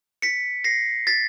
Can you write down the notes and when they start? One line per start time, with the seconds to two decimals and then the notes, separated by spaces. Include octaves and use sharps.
0.22 B6 C#7
0.64 A#6 C7
1.07 A6 B6